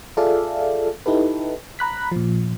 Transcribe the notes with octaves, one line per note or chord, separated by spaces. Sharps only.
F4 G#4 A4 D5 E5 F5
D#4 E4 G4 A4 B4
A#5 B5 F#6 B6
A#2 F3